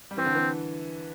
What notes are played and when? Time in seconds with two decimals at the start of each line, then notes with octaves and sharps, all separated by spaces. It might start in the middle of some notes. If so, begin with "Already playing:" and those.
0.11 G3
0.17 E3 C4
0.26 D3
0.35 E3